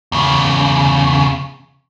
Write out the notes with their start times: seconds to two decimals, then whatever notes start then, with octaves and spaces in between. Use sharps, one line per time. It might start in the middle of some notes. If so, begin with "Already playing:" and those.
0.12 E2 C#3